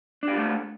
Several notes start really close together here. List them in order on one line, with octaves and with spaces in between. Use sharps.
D4 G4 F4 A3